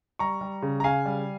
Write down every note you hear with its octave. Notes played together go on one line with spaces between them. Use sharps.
G3 A#5 C#6
G3
C#3
A#5
C#3 F5 G#5
G3